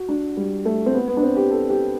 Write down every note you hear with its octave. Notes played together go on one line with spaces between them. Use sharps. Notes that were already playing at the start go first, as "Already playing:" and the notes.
Already playing: F#4
D4
G3
A3
C4
B3
B3
D4
C4
G4
A4
G4